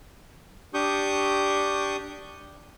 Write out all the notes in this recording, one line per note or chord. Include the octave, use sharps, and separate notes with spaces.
D4 G4 C#6 D#6 G6